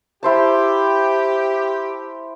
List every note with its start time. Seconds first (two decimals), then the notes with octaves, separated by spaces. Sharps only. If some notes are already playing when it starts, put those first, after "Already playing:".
0.23 E4 G4 C5 A5